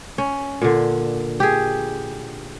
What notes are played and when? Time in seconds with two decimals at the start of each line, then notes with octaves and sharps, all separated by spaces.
0.18 C#4
0.62 A#2 D3
1.40 G4 G#4